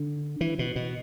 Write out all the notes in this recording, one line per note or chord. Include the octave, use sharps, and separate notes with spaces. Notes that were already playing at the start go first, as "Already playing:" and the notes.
Already playing: D3
E3
B2
B2